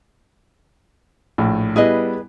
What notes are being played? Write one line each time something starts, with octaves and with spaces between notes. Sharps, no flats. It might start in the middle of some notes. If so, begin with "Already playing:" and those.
A#1 A2
G3 B3 E4 G#4 B4 D#5